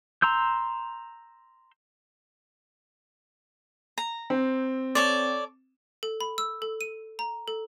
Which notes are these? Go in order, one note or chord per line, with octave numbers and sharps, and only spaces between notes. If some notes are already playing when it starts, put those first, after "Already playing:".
A#5 C6 E6 G6
A#5
C4
A4 C#5 D5
A4
B5
E6
A4
D#7
A#5
A4